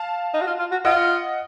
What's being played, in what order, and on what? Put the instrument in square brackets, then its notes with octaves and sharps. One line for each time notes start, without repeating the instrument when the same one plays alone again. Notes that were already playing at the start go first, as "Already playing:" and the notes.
Already playing: [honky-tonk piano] F5 A5
[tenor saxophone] D#4
F#4
F4
F4
F#4
[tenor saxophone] F4 [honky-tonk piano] D#5 F#5